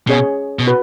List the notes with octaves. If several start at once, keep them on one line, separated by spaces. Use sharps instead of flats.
B2 C#4 G#4 C#5
B2
F#4 B4